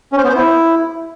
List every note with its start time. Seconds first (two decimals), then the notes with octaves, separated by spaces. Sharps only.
0.13 C#4
0.18 C5
0.24 B3
0.29 C5
0.35 E4